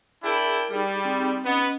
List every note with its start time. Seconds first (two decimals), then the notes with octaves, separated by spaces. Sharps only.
0.24 D4 E4 G#4 A#4 G5
0.71 G3 D#4 G#4
1.05 C4 D#4 G#4
1.45 B3 C#4 D#5 F#5